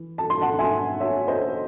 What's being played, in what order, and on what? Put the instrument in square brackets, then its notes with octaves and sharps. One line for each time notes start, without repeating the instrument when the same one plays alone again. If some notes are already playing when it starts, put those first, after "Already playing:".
Already playing: [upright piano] E3
A5
C6
F#5 A5
E5 G#5
C#5 E5
C5 D#5